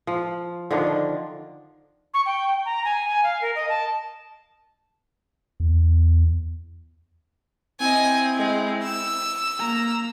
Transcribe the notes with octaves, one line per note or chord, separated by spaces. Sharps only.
F3
D3 D#3 F3 D4
C#6
G5
A#5
G#5
G#5
F5
A#4
D#5
A5
E2
C4 E4 D#5 G#5
G#3
E6
A#3 A#5